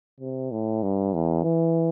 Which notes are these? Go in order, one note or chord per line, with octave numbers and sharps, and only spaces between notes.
C3
A2
G2
E2
E3